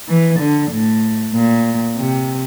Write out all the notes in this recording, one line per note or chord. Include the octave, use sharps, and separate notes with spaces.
E3
D3
A2
A#2
C3